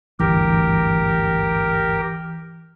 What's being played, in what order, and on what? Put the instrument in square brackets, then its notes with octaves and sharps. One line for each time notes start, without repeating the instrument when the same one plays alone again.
[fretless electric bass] G#1 D2 G2 [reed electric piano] E3 [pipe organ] G4 A#4